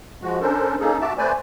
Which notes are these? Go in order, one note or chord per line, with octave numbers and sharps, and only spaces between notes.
F3 G#3 F#4
C#4 D4 A4 A#4 C5
A#3 C#4 D#4 G#4 A4
F#4 E5 A5 D6
A3 C4 B4 C5 D5 G#5